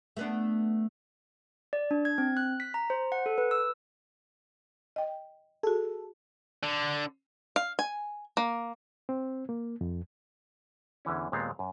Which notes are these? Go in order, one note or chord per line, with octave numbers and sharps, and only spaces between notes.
A3 B3 D4
D5
D4
G#6
C4
F#6
B6
A#5
C5
F#5
A4
B4
E6
D#5 G5
F#4 G#4 A4
D3
F5
G#5
A#3
C4
A#3
F2
E2 D3 E3 C#4
D#2 A#2 G#3 B3 C4 F5
F#2